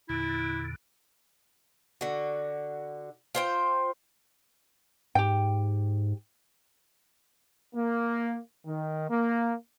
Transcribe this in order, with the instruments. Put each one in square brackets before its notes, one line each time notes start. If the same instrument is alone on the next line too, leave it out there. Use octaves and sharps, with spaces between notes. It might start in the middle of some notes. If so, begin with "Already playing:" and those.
[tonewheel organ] E2 A#2 D3 [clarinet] E4
[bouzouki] D3 F#4
F4 C5 G5
[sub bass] G#2 [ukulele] G4 G5
[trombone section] A#3
D#3
A#3